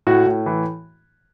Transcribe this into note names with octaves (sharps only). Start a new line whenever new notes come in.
A2 F#4
A2
E3